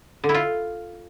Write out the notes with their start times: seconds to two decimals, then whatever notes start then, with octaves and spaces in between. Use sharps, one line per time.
0.24 D3
0.29 E4
0.34 F4